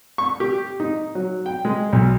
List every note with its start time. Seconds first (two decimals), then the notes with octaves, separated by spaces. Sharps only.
0.18 C#6
0.40 G4
0.80 D#4
1.15 F#3
1.46 G5
1.65 G#3
1.93 B1